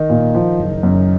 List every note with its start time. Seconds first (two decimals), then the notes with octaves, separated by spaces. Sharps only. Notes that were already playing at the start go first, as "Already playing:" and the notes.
Already playing: D#3 D#4
0.10 A#2
0.35 F3
0.59 F#1
0.83 F#2